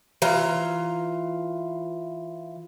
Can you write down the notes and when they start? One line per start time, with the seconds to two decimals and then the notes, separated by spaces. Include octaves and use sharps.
0.22 E3 F4 A#5